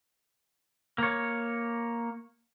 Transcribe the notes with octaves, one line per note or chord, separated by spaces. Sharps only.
A#3 C#5